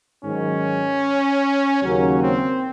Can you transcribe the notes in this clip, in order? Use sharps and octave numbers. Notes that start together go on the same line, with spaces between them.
G#2 D#3 F#3 C#4
D#2 C#3 F#3 A#3 C#4
C4